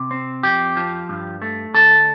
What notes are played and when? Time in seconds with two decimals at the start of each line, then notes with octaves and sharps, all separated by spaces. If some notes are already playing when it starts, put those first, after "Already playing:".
Already playing: C3
0.11 C4
0.43 F2 G4
0.77 F3
1.09 G2
1.42 A3
1.74 D2 A4